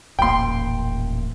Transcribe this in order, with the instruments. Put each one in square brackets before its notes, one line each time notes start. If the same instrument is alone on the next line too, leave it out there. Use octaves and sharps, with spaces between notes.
[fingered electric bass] D#1 A1 A#3 [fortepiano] G5 C6